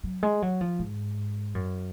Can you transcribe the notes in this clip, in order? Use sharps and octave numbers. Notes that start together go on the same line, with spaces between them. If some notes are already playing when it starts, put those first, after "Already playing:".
F#3
G#3
F#3
F3
G#2
F#2